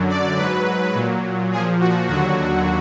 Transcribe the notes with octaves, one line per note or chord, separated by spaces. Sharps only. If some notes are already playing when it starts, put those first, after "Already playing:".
Already playing: F#2 D3 F#3
D5
G#2 F#3 B4
A#2 F#3
A#2 F3 G#4
F#4
D#2 D3 F#3 F#4